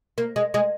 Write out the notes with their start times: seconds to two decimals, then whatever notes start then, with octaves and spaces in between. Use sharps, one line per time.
0.18 A#3
0.36 G#3
0.54 G#3